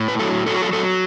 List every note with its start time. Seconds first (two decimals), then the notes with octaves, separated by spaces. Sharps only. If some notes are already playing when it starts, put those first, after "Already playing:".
Already playing: A2
0.08 B4
0.19 F#3 A4
0.46 F#3 A4
0.54 F#4
0.62 A4
0.73 F#3 A4